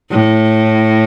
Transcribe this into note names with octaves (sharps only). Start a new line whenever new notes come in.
A2